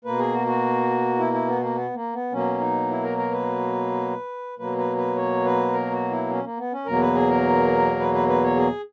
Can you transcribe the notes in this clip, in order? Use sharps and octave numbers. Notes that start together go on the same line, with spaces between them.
B2 A#3 B4
G#4
F#4
F#4
E4
E4
B3
A#3
B3
A#3
B3
B2 F#3 A#3 C#4
D#4
E4
A#4
A#4
B4
B2 F#3 A#3 B4
B4
B4
C#5
B4
A#4
F#4
E4
C#4
A#3
B3
C#4
E2 B2 F#3 A#3 A#4
B4
G#4
A#4
B4
B4
B4
C#5
G#4